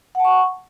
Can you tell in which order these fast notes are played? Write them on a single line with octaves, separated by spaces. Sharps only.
F#5 A5 C#6